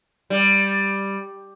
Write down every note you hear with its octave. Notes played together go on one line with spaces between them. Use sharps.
G3